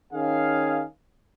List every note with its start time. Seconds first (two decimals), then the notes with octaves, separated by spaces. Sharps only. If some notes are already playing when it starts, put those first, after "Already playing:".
0.13 D#3 C#4 G#4 F5